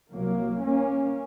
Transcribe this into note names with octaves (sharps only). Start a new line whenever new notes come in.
C2 C3 F#3 A#3
A#3 C#4